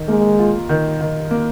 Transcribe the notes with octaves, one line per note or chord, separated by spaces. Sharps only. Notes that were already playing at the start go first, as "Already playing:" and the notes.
Already playing: D#3
G#3 A#3
F4
D#3
D#3
A#3